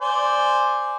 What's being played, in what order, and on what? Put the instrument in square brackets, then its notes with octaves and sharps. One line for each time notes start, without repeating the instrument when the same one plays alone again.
[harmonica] C5 D5 G#5